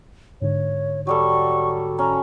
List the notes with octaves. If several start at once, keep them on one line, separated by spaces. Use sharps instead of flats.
G#2 D3 C#5
F#3 G3 A4 C#6
C#4 A#5